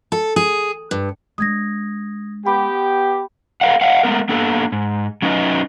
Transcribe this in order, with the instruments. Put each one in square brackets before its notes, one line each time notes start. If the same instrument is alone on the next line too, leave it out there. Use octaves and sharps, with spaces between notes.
[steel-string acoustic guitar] A4
G#4
G2
[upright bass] G#3 D4 [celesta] D#6 G#6 A#6
[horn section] B3 G4 [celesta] G5 B5
[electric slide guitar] A4 B4 D#5 F5 F#5
C#5 D#5 F5 F#5
G#3 A3 B3 A#4
A#3 B3 D4 A4
G#2
F#3 C#4 D#4 F#4 B4 D#5